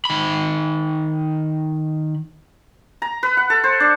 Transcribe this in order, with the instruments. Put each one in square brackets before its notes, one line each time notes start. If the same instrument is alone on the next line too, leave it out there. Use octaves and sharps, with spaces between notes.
[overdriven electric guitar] D#3 B5
[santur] A#5
B4
F#5
A4
C5
D4